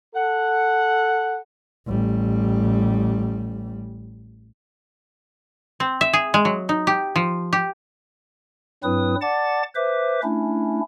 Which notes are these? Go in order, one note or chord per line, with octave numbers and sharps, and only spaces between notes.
A4 F#5
A1 G3
C4
E5
G#4
G#3
F#3
D#4
G4
F3
G4
G2 F#3 C4 E4 B4 D#6
D5 F#5 A5 D6 A6
B4 C5 E5 D6
A3 C#4 D4 E4